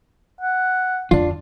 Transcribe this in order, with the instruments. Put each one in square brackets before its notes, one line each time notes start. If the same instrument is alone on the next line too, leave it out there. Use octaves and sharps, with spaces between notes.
[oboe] F#5
[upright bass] F2 D3 [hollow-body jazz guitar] D4 F4